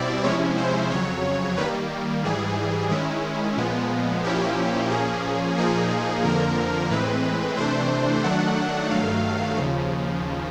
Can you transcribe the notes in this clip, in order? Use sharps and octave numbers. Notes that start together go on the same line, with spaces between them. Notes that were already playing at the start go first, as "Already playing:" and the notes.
Already playing: B2 G3 C4 E4 D5
C3 F3 G#3 C#4 E4 C#5
C5
F2 C#3 F#3 C#5
D#3 G3 A#3 B4
G#2 E3 G3 G#4
D#3 G#3 C#4 E4
A#2 F3 G#3 B3
A#2 F3 A#3 C#4 E4 G4
A#2 F3 A#3 C#4 G#4
A#2 F3 A#3 D#4 G#4
F2 D3 F3 A#3 A#4
A2 E3 G#3 C4 B4
C3 E3 A3 D4 C5
D#3 F#3 A3 D4 F#5
G2 D#3 F#3 A3 F5
D#2 C#3 F3